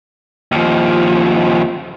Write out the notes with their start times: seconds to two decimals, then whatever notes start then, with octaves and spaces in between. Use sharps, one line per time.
0.52 D#2 F3